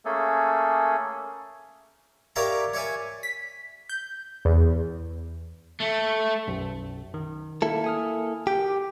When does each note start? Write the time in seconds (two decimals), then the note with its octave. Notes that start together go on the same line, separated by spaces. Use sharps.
0.05 A3 A#3 C#4 G#4 A4
2.36 G4 A#4 C#5 D5 E5 F5
2.74 C#5 D5 E5 G#5
3.23 B6
3.89 G6
4.45 E2
5.80 A3
6.47 B1 F#2
7.14 D#3
7.62 A#3 E4 A4
7.84 G#5 D#6 F6
8.47 G4 D6 G6